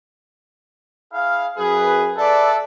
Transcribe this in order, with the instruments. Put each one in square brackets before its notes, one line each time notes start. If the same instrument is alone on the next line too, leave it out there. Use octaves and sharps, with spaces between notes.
[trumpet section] E4 G#4 F5
[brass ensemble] F#2 G#4 [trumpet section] B4
[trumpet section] A4 B4 E5 [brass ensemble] D5